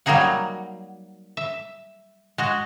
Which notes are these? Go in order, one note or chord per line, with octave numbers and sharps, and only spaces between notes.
F#3 G3 A#3 D#4 G#4 F#5
E5
G#3 F#4